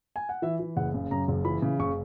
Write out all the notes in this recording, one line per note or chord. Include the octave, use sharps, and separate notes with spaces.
G#5
F#5
E3 E5
E3
F#1 F#5
C#3
F#2 A#5
F#1
E3 B5
C#3
F#1 C#6